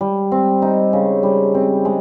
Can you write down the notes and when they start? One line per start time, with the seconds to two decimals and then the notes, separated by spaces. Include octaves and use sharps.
0.01 G3
0.32 C4
0.62 D#4
0.93 C#3
1.23 G3
1.54 C4
1.85 G#3